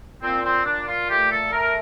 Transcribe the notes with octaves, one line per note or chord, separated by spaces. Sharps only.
A#2 C4
C4
A#2 D4
F4
A3 G4
A4
A3 A#4